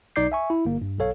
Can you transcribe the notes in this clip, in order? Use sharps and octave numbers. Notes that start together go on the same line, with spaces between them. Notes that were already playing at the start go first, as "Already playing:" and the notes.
B1 D#4 D5 D6 G6 C7
E5 G#5 C#6
E4
G1 A#3
G2
B1 A4 C#5 F5